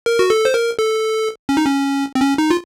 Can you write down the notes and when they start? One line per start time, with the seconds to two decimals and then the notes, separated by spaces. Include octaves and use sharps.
0.06 A#4
0.19 F#4
0.30 A4
0.45 C5
0.54 A#4
0.79 A4
1.49 C#4
1.57 D#4
1.66 C#4
2.15 C4
2.21 C#4
2.38 D#4
2.50 F4